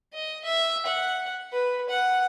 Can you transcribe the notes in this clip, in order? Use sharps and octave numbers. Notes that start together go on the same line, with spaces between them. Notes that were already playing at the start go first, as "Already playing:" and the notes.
D#5
E5
F#5
B4
F#5